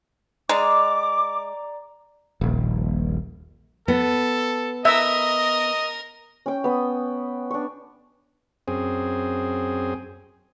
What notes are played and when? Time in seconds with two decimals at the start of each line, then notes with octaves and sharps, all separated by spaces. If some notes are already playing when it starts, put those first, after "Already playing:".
0.49 G#3 D5 A#5 D6
2.41 D#1 A#1
3.88 B3 A4
4.85 A#4 D#5 E5
6.46 C#4 G5
6.64 B3 D#6
7.51 D4 C#6
8.68 F#2 C4 G#4